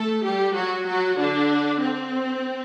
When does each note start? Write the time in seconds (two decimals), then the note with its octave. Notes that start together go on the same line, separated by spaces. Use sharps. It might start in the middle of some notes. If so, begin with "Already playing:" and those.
Already playing: A3 A4
0.25 G3 G4
0.56 F#3 F#4
0.87 F#3 F#4
1.19 D3 D4
1.81 C4